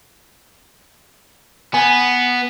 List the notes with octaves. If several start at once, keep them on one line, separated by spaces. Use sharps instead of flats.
B3 G#5